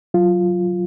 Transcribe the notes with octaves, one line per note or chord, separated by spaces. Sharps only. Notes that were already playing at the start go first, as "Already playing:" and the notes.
F#3 F4